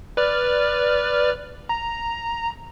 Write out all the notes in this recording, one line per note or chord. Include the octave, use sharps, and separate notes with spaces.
B4 D5 F6
A#5